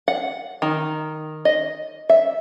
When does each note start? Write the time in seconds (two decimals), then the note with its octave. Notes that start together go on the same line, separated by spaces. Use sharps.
0.08 F#5
0.62 D#3
1.45 D#5
2.09 E5